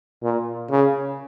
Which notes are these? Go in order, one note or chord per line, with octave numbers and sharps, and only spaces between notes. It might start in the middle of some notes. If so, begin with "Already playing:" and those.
A#2
C#3